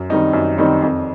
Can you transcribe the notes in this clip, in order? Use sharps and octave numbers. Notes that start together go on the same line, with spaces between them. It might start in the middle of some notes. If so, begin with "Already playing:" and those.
Already playing: F#2
D#3 G3 C4 D#4
F#2
D#3 G3 C4 D#4
F2